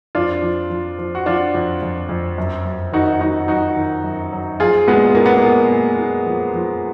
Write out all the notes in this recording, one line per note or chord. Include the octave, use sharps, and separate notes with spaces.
F2 D4 F4
F3
F3
F3
F#4
F3 D4 F4
F2
F2
F2
F#2
F#2
D#3 D#4 F#4
F#2 D#4 F#4
F#3 D#4 F#4
D#3
F#2
F#3
F3 F4 G#4
A#2 G#3 B3
A#2 A#3
B3
A#3
A#2
A#2
A#2
F3
F3